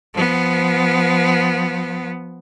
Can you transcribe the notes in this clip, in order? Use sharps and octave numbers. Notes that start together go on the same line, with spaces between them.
F3 B3